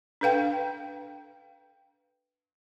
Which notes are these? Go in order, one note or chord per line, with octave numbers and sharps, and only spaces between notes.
D4 A4 B4 F5 G5